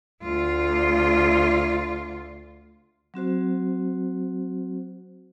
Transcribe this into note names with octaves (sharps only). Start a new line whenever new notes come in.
D2 F4
F#3 C4 F#4 C5